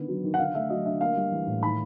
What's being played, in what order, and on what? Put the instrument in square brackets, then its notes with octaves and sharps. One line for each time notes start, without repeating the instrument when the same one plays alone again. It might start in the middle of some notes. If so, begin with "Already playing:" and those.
Already playing: [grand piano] D3 D#3 B3
F#3
D#3
F#5
D3 F5
A3 E5
F#3 D#5
D3 E5
A#3 F5
G3
E3
A2
D#3 B5